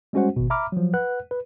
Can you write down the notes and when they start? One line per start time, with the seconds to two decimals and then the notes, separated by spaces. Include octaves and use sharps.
0.13 G3 G#3 C#4 F#4 C5 F#5
0.36 G#1 B2
0.50 E5 A#5 B5 D6 F6
0.72 F3 F#3
0.94 B4 F#5 F#6
1.31 B4